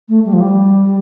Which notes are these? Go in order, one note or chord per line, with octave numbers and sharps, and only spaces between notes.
A3
G3
F3
G3